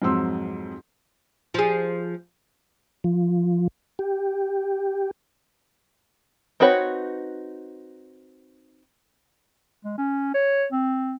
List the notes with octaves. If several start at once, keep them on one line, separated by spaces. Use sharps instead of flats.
F2 G#2 F#3 C4 C6 E6
F3 G#4
F3
G4
C4 D#4 F#4 B4 C#5
G#3
C#4
C#5
C4